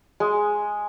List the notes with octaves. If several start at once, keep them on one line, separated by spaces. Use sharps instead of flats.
G#3